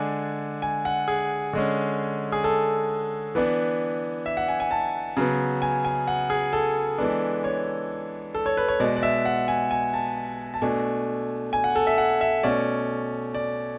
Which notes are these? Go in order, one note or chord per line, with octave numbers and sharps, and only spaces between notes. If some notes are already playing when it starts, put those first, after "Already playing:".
Already playing: D3 G#3 D4 G#5
G#5
F#5
G#4
D3 G#3 C#4
G#4
A4
E3 B3 D4
E5
F#5
G#5
G#5
A5
C#3 F#3 B3
G#5
G#5
F#5
G#4
A4
E3 G#3 B3 D4
C#5
A4
C#5
B4
C#5
B2 G#3 B3 D5
D5
E5
F#5
G#5
G#5
A5
A5
B2 A3 D4 G#5
G#5
F#5
A4
E5
F#5
E5
B2 A3 C#4 D5
D5